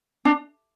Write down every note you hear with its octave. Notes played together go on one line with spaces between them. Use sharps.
D4